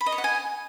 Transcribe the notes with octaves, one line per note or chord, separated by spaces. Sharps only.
B5
D#5
C#5
F#5
G#5